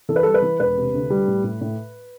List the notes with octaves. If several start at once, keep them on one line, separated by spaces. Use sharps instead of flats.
E3 A4
B4
G3 A4
B4
E3
E1 B4
C3
D2
G3
A2
A2
A2